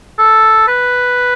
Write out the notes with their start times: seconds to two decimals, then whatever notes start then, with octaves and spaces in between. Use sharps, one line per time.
0.18 A4
0.68 B4